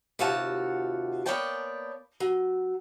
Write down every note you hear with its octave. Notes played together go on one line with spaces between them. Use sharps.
D#2 C3 F4 F#4 F#5 A5
A#3 B3 C#5 D5 G5 A5
F#3